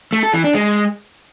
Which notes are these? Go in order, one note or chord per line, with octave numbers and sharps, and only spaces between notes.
A3
A4
E3
D4
G#3